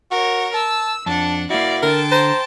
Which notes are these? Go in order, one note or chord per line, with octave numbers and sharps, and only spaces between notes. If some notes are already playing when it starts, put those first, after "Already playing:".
F#4 A#4 C#5
A5 E6
F2 D4 F#5 A5
A#3 E4 F#4 D5 F5
D3 A#4 G5 A5
C5 A#5